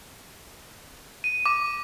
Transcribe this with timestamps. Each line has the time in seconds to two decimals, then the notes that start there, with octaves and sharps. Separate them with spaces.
1.24 D#7
1.46 D6